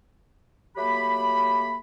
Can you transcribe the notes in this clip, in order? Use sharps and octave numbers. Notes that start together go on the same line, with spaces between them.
F#3 A3 A#3 G4 B5